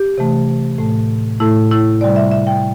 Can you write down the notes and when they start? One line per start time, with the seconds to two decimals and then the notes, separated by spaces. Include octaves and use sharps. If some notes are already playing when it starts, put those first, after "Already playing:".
Already playing: G4
0.18 C3 E3 A3
0.78 A2 A3
1.40 A2 A3 E4
1.71 E4
2.01 C3 G3 D5
2.16 E5
2.31 E5
2.47 G5